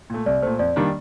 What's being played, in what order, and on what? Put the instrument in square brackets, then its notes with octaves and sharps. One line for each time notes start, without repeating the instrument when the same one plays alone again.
[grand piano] A#2 A3
[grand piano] C2 [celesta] D5
[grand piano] A#2 A3 [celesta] C5
[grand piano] F2 [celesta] D5
[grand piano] D#3 G3 A#3 D4